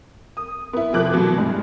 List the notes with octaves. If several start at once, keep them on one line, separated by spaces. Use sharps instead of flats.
D#6
B3 E4
F1 F3 D6 F#6
B2 E3 F#3 A3
G2 G#3